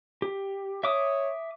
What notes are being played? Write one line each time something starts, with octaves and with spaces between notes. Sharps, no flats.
G4
C#5 E5 D6 D#6